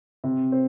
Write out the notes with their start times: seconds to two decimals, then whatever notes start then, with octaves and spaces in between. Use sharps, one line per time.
0.24 C3
0.52 C4